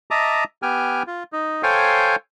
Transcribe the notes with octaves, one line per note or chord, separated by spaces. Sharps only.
D#5 E5 A5 A#5 D6 D#6
B3 G4 G5 G#5 F6
F4
D#4
A4 C5 C#5 F5 G5 G#5